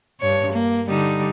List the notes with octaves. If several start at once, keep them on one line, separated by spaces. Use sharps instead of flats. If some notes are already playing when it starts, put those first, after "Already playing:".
G2 C#5
A#3
D3 G3 D#4